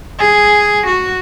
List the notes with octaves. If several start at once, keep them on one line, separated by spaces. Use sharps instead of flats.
G#4
F#4